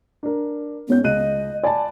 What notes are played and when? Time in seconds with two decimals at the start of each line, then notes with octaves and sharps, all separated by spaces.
0.23 D4 A#4
0.88 G#2 B3 C#4 G6
1.04 C#2 D#5 F#6 D#7
1.63 D5 G#5 A5 B5